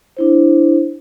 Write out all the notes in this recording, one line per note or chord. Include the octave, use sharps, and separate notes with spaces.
D4 E4 C5